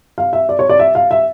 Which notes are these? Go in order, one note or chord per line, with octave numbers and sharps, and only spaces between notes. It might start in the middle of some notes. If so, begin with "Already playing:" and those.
F5
E5
D5
C#5
D5
E5
F5
E5